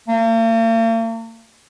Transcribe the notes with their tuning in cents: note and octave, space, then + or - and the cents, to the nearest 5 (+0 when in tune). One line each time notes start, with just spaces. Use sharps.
A#3 -45